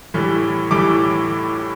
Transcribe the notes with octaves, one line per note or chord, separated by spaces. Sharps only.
A2 E3 G3
A2 E3 G3 D6